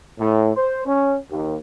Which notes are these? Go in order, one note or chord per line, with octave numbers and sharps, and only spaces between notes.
A2
C5
C#4
D#2